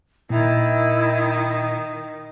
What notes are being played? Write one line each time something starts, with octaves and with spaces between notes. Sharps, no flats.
A#2 D#3 E4